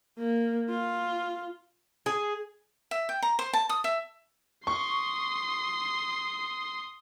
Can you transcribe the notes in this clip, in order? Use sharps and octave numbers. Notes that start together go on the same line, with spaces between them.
A#3
F4
G#4
E5
G5
A#5
C5
A5
D#6
E5
C6 C#6 D#6